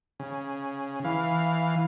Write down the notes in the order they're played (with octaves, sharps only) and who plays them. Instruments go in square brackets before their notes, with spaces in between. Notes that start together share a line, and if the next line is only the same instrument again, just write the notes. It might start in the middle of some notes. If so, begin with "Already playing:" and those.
[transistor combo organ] C#3
E3 F5